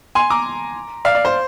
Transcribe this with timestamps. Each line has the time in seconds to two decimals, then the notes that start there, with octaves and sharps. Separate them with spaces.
0.15 G#5 C6
0.30 A#5 D6
1.05 D5 F5
1.15 D5
1.25 C5